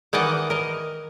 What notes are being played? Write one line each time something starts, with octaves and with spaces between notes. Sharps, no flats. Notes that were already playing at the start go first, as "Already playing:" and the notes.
D#3 E3 D5 D#5 F#5
A#4 D#5